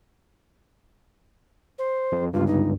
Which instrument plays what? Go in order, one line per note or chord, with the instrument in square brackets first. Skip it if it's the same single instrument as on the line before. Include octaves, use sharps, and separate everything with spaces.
[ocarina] C5
[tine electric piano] F2
[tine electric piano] G1 C#2 G2 [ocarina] F4
[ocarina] D#4